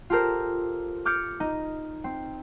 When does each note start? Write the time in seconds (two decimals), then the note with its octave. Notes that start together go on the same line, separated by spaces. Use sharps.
0.10 F4 G4 A4 A#4 C5
1.05 D6 F6 G6 A6 C#7 D7
1.40 D#4
2.04 C4